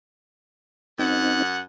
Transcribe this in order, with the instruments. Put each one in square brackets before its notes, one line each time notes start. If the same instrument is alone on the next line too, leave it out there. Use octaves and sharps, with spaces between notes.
[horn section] F#2 F#5 [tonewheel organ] C4 D#4